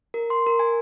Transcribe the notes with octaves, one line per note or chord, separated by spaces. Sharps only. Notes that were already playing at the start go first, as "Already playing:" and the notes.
A#4
C6
A#4
G#5